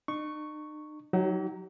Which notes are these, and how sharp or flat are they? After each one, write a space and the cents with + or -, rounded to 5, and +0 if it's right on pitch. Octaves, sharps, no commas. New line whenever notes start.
D#4 -45 C#6 +0
F#3 +0 D#4 +20 G4 -45